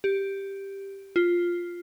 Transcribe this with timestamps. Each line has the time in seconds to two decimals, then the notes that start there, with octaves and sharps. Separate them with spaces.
0.04 G4
1.16 F4